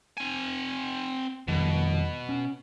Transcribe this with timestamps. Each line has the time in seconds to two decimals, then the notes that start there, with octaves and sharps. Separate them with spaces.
0.17 C4 G#5
1.48 F2 B2 D#3 G3
2.29 C#4